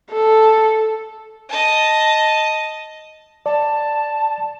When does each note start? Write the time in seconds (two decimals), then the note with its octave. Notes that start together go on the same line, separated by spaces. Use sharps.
0.11 A4
1.49 D#5 A5
3.46 D5 A5